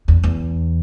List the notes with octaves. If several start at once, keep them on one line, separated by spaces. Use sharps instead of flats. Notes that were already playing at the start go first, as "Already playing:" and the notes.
E2
E2